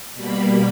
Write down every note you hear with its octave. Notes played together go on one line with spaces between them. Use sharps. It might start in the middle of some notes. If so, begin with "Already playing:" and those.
B2 G3 A#3 B5